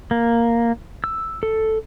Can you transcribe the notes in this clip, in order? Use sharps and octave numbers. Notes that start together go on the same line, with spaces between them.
A#3
E6
A4